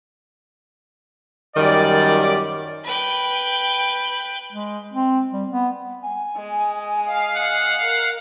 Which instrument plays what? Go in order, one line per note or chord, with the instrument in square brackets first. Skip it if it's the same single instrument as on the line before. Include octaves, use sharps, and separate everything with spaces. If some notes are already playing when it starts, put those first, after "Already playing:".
[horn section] F#2 G3 D5 [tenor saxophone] D#3
[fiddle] B4 G5
[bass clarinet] G#3
C4
G3
B3
[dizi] G#5
[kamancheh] G#3 D#5
[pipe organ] F5
[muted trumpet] F#5
[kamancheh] A#4